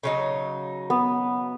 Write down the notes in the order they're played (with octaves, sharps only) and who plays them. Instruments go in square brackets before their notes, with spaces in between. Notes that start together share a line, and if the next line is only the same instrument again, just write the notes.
[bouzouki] C#3 F#3 D#4
[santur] B3